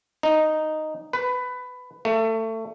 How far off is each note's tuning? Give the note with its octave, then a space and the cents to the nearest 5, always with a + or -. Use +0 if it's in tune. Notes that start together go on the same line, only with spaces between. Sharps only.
D#4 -5
B4 +15
A3 +25